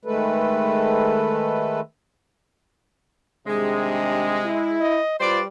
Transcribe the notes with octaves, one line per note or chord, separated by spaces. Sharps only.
D#3 G#3 A3 A4 B4
C3 D#3 G3 G#3 D4
E4
D#5
G3 F4 B4 C5 D5